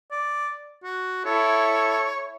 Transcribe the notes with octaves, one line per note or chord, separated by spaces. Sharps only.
D5
F#4
E4 A4 C#5